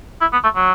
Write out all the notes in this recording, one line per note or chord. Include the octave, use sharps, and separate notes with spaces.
E4
B3
A3
F#3